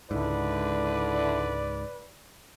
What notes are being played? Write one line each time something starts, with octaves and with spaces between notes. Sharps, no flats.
C#2 G#2 D3 E4 B4 D5